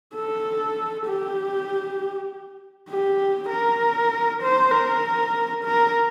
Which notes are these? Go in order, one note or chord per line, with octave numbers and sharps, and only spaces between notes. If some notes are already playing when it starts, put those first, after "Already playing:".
A4
G4
G4
A#4
C5
A#4
A#4